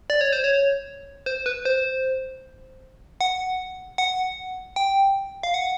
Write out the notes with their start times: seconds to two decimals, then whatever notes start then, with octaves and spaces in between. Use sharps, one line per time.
0.10 D5
0.21 C#5
0.33 C5
0.44 C#5
1.26 C5
1.46 B4
1.65 C5
3.21 F#5
3.98 F#5
4.76 G5
5.43 F5
5.54 F#5